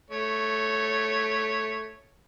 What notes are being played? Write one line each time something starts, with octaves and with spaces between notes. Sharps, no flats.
A3 C#5